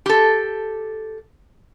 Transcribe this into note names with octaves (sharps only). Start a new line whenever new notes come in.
G4 A4